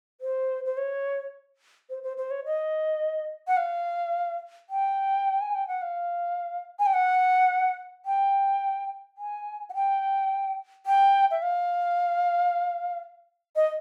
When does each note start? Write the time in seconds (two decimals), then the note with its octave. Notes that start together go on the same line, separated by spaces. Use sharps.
0.21 C5
0.65 C5
0.77 C#5
1.90 C5
2.03 C5
2.17 C5
2.31 C#5
2.45 D#5
3.48 F#5
3.57 F5
4.70 G5
5.41 G#5
5.55 G5
5.68 F#5
5.82 F5
6.79 G#5
6.86 G5
6.94 F#5
8.06 G5
9.18 G#5
9.70 F#5
9.74 G5
10.86 G5
11.31 E5
11.43 F5
13.56 D#5